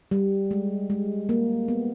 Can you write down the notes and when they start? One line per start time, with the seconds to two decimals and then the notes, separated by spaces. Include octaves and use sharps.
0.11 G3
0.51 G#3
0.90 G#3
1.29 A#3
1.68 B3